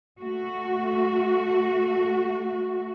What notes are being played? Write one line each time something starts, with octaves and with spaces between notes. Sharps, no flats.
A3 F#4